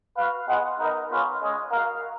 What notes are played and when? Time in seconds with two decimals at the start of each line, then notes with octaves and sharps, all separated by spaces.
0.17 F#4 B4 F5
0.47 B3 F4 G#4 D#5 F#5
0.79 B3 D#4 A#4 D#5
1.10 B3 F4 G#4 C#5 F5
1.41 G#3 C#4 G#4 D#5
1.71 F#4 A#4 F5